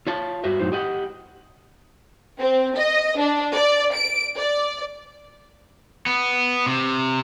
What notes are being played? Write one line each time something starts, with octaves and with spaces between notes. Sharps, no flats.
F4 C#5 A5
G2 F#4 B4 E5
F#2 A2 F#3 D#4 C5
G4 D#5 F#5
C4
D#5
D4
D5
D7
D5
B3
C3